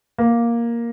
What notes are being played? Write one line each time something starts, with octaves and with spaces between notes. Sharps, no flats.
A#3